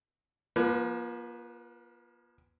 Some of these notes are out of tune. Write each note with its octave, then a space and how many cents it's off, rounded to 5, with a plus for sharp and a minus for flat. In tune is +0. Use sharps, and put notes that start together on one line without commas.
F3 +0 A#3 +40 B4 +10